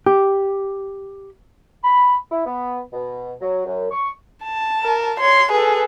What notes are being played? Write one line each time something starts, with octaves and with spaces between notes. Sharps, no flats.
G4
B5
E4
B3
B2
F#3
F#2
C#6
A5
A#4
C#5 C6
G#4 A4 B4